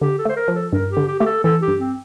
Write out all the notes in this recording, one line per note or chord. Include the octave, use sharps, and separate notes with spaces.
D3 G4
A4
A3 C5
A#4
F3
A4
G2 A#4
G4
D3
G4
A3 G4
A4
E3 A4
G4
G2
C4